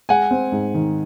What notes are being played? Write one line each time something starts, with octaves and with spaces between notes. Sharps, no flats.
G#3 F#5 G#5
C4
G#2
D#3